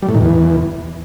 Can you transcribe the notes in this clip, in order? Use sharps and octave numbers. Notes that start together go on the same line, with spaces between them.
G3
A2
D#3
E2